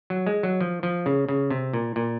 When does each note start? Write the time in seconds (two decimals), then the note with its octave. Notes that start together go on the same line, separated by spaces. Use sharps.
0.10 F#3
0.27 G#3
0.43 F#3
0.61 F3
0.83 F3
1.06 C#3
1.29 C#3
1.51 C3
1.73 A#2
1.96 A#2